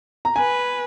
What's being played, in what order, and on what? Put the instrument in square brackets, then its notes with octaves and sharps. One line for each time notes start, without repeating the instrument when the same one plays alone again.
[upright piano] A#5
[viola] B4 [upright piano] G#5